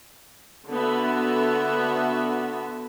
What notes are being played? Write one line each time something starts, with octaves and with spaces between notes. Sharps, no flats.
D3 B3 F#4 E5 B5